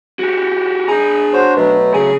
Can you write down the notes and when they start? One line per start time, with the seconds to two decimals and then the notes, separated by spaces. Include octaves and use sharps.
0.19 F#4 G4
0.88 D4 G#4 A#5
1.33 F#4 C5 C#5
1.57 B2 F#3 A3
1.94 C#3 G#4